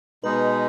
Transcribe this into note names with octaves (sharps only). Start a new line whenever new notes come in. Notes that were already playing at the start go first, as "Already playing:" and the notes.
B2 G#3 D#4 B4